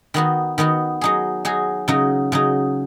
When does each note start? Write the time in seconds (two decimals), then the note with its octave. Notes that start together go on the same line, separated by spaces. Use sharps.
0.14 D#3 B3 D#4 F#4
0.58 D#3 B3 D#4 F#4
1.01 F#3 D#4 G#4
1.45 F#3 D#4 G#4
1.88 C#3 F#3 D#4
2.32 C#3 F#3 D#4